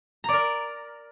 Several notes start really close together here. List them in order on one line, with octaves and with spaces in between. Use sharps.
A#5 D5 A#4